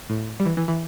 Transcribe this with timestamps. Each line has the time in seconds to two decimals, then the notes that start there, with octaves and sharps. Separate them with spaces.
0.10 A2
0.40 G3
0.45 E3
0.57 E3
0.68 E3